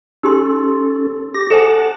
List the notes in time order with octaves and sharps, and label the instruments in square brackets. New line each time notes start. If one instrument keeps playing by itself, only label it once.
[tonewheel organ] C#4 A4 [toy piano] D#4 G4 C6
[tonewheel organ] G4 A#6
[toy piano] A4 C5 G#5 [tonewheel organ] F#5 A5